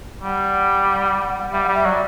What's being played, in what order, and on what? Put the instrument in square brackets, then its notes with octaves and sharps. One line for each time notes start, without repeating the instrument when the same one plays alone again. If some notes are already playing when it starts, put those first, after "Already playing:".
[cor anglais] G3 [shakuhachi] F#5
[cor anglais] G3 [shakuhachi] E5
[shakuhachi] F#5
[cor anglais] G3
[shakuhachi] E5
[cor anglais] F#3 [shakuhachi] D5